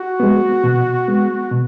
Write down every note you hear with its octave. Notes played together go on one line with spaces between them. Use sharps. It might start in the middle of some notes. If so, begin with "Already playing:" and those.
Already playing: F#4
G#3 B3
B2
G#3 B3
B2